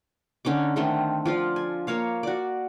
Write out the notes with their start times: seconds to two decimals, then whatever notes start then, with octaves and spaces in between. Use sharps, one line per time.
0.45 D3 C#4 D#4 D6
0.76 D3 D#3 A3 C4
1.25 F3 F4 D5
1.56 G#5
1.87 A#3 A#4 C#5 F5
2.23 F#4 D5